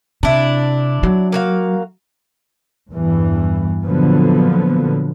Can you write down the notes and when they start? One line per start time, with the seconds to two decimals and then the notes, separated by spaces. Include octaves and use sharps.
0.23 C3 D4 E4
1.03 F#3
1.32 A#3 F#4 F5
2.90 E2 G2 E3
3.84 A#2 D3 F3 F#3 B3